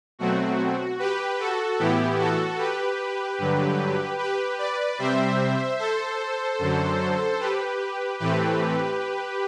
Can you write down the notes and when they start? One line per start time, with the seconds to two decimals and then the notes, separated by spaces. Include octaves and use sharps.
0.19 B2 F#3 A3 C4 F#4
0.99 G4 B4
1.39 F#4 A4
1.79 A2 E3 B3 E4 G4
2.19 F#4 A4
2.58 G4 B4
3.38 G2 D3 F#3
4.18 G4 B4
4.58 B4 D5
4.99 C3 G3 C4 C5 E5
5.79 A4 C5
6.59 F#2 D3 F#3
7.39 G4 B4
8.19 A2 E3 A3 C4 G4 B4